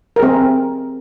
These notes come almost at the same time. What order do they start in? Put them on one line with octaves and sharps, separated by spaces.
A#4 G#4 C4